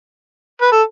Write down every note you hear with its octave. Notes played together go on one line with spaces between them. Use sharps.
B4
A4